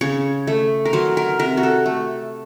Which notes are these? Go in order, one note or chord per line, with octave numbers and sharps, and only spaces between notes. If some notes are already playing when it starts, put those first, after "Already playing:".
C#3 C#5
A3
A#4
F#3 C5
A#4
C3 A#4
F#4
A4
A3